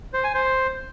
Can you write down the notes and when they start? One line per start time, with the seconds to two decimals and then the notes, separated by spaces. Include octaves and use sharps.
0.14 C5
0.24 G#5
0.34 C5